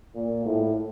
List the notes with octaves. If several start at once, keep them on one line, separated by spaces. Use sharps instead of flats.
A#2
A2